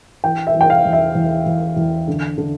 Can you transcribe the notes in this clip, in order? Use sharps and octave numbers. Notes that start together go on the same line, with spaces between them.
E3 G5
E5
E3
G5
F5
E2
E5
E2
E2
E2
D3
D3